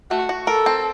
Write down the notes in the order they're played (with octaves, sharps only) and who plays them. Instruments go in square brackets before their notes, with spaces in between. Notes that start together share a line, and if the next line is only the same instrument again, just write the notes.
[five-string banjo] A3 [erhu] F#4
[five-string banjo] F#4
[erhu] A4 [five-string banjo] A#4
[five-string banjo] C4